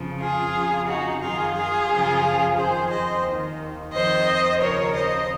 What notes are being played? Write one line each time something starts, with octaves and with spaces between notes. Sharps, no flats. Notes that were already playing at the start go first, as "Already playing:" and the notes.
Already playing: F2 C#3 F3
F4 G#4
F2 C#3 F3
D#4 F#4
F#2 D#3 F4 G#4
F4 G#4
F#2 C#3 F3
F2 D#3 G#4 C5
C5 D#5
D#2 D#3
F2 D#3 C5 D#5
D#2 C#3 F3 A#4 C#5
C5 D#5